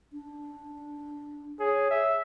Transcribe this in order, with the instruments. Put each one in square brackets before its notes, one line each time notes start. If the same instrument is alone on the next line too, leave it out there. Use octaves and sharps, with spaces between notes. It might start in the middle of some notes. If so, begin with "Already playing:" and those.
[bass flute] D4
[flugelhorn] G#4 [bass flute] C#5
[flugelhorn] E5